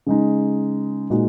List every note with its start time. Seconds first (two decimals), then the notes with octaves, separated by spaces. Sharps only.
0.06 C#3 G#3 D#4
1.10 A#2 G#3 D#4 F#4